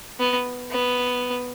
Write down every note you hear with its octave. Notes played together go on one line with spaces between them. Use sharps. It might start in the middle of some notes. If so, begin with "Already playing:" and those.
B3
B3